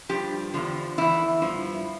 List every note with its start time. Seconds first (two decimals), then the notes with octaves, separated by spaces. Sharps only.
0.09 G2 F3 G4
0.54 E2 D3 F3
0.98 E2 E3 E4
1.42 G2 F3